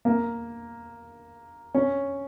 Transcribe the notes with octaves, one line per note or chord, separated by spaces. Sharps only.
A#3
C#4